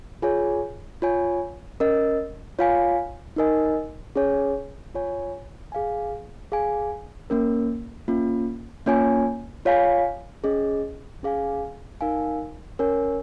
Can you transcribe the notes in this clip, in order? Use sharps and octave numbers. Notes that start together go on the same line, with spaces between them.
F4 G#4 C#5 G#5
F4 C#5 G#5
C#4 A#4 D#5
F4 C#5 F5 G#5
D#4 A#4 D#5 G#5
C#4 G#4 C#5 G#5
F4 C#5 G#5
G#4 F5 G#5
G#4 F5 G#5
A#3 C#4 A#4
A#3 C#4 F4
A#3 C#4 F4 C#5 G#5
F4 C#5 F5 G#5
C#4 G#4 D#5
C#4 G#4 F5 G#5
D#4 A#4 F5 G#5
C#4 A#4 C#5 G#5